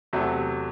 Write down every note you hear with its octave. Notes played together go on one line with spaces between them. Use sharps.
E2 C3 F#3 A3